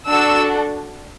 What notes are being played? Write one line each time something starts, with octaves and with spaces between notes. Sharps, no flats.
D4 F#4 A4 E6